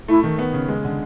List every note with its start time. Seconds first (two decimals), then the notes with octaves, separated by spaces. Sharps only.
0.08 A3 E4
0.23 D#3
0.38 B3
0.53 C#3
0.68 G#3
0.84 D3